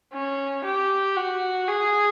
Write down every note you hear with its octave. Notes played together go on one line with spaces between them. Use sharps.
C#4
G4
F#4
G#4